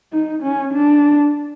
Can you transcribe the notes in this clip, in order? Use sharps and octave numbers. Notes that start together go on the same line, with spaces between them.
D#4
C#4
D4